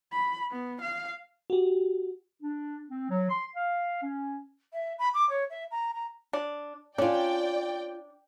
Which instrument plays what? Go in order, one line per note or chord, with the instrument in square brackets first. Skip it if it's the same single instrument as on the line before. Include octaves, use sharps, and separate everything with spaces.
[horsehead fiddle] B5
B3
F5
[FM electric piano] F#4 G4
[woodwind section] D4
C4
F#3
C6
F5
C#4
[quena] E5
B5
D6
C#5
E5
A#5
A#5
[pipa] D4
[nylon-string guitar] C#4 F4 [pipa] D4 [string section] D5 G5